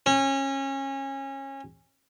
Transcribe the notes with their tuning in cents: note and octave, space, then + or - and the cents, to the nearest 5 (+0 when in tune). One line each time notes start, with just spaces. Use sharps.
C#4 -25